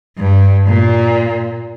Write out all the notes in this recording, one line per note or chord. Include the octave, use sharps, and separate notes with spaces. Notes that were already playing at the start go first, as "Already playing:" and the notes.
G2
A#2